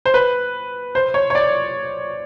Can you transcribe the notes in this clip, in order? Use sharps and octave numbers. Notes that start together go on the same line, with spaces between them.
C5
B4
C5
C#5
C#5
D5